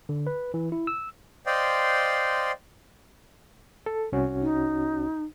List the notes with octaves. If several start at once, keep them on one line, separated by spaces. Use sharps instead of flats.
D3
B4
E3
E4
E6
C5 D5 D#5 F5 G5 C6
A4
C2 C#4 F#4
D#4